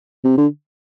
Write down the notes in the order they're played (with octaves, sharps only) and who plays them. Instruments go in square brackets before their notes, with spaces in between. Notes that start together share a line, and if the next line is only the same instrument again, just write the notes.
[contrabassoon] C3
D3